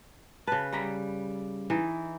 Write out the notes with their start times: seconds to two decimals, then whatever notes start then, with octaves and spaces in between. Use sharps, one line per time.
0.47 C#3 B4 A5
0.73 G3 A#5 B5
1.70 E3 D#4